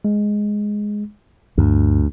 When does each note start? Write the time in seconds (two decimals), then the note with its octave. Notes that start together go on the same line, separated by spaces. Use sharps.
0.05 G#3
1.58 D2 G2